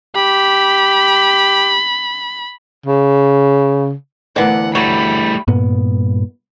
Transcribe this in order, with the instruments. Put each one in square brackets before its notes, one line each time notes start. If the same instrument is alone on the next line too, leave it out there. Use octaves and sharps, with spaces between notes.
[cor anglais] G4 [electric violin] B5
[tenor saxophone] C#3
[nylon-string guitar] D2 E3 D5 [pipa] A#3 B3 [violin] F#5
[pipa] F#3 [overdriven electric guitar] G3 A3 [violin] B5
[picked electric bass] G2 A#2 B3